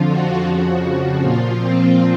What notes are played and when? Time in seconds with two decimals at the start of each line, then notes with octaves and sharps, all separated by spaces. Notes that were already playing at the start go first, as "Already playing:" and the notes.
Already playing: F2 D3 F3 F4
0.09 F#4
0.46 F2 C#3 F3
1.21 A#2 F3 F4
1.58 C4